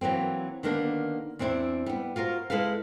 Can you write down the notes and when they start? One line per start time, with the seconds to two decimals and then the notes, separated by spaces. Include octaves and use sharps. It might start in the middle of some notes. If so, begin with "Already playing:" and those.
0.01 E3 F#3 A#3 C4
0.63 D3 D#3 G3 A#3 B3 D4
1.39 E2 C4 D4 E4 C5
1.86 G3 B3
2.16 F4 F#4 A#4 C5
2.50 G#3 E4 A4 B4 F5